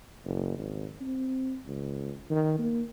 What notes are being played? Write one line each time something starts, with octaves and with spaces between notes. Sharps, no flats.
F#1
G#1
C4
C#2
D#3
A#3